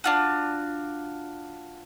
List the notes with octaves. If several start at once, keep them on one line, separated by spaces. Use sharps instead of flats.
D4 F4 F#4